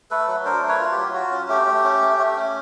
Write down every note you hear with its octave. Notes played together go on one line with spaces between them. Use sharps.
A3 A4 B4
F#3
D4 A#4 C5
A3
B4 C#5
F4
G4
F#3
F4 F#4
C#4
A3 G4
A3
C#4
A3
A3
C#4